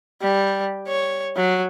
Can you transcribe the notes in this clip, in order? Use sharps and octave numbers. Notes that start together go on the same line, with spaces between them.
G3
C#5
F#3